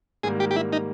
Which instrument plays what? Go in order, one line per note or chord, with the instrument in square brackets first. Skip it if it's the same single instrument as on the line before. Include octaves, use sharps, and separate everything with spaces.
[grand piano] G#2 D#3 G3 A#3 [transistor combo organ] G#4
[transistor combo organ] G4
G4
E4
D#4